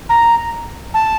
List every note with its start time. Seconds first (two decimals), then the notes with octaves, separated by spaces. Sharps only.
0.09 A#5
0.94 A5